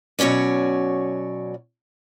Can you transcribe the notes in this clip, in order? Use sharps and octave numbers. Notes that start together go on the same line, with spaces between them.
B2 F#3 C#4 C#5 D5